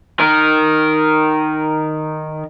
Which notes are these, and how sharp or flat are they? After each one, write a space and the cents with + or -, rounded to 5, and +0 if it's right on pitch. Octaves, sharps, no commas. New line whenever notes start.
D#3 -5 A#4 +0